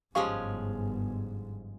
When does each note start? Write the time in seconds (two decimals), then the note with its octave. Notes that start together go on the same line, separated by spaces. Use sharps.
0.15 G1 G#2 F3 G#3 C#4 G4 F5 C#6